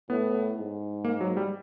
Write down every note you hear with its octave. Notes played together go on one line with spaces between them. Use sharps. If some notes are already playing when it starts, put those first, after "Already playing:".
A2 B3
G#2
A#3
F#3
G3